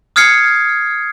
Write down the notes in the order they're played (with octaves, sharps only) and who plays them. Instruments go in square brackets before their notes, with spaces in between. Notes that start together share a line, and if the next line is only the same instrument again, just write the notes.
[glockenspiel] D#6 F6 G#6 C7 C#7